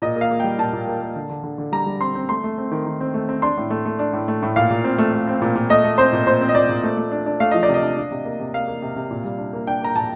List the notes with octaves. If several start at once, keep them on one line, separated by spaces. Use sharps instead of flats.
A#2 D#5
A#3
F5
A#3
G3 G5
A#2 A5
A#2
A#3
A#3
D3
D3
D3
D3
G3 A#5
G3
C4 C6
C4
A3 C6
A3
C4
D#3
D#3
C4
A3
C4
D4 C6
A2
A3
A3
D4
A2
A3
A2
A#2 F5
A#2
C4
A3
A3
C4
A#2
A#2
A3 D#5
A3
C4 C5
A#2
A#2 C5
C4
D#5
A#2 D5
A#2
A3
A3
D4
D4
A3 F5
F3 D#5
D5
C3
D#5
D4
D4
C3
A#3
C3
A#3 F5
A#3
C3
C3
A#2
G3
D4
A#3
D4 G5
A#3 A#5
A#2 A5